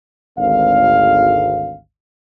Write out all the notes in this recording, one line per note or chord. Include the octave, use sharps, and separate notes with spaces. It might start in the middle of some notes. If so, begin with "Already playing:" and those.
G#1 D2 F5